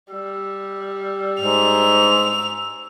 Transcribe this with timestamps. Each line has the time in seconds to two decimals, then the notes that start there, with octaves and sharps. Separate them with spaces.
0.11 G3 E6
1.41 G#2 F7